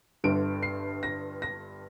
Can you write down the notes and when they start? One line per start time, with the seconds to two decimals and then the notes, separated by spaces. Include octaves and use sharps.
0.24 G1 G2 D3 D7
0.63 C7
1.03 A#6
1.42 A#6